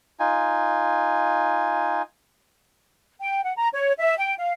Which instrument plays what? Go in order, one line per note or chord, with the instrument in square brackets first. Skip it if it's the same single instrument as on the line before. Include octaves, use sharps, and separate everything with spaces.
[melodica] D#4 F4 G#5
[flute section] G5
F#5
A#5
C#5
E5
G5
F5